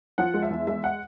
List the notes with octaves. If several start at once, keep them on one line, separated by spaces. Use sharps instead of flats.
F3 F#5
G#3
E5
E2
G#3 E5
F#5